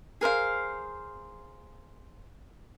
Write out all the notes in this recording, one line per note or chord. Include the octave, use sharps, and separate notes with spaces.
G#4 A#4 C5 F5